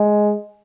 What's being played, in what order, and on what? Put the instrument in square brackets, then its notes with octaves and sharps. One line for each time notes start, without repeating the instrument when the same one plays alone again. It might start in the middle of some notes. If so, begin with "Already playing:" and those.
Already playing: [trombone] G#3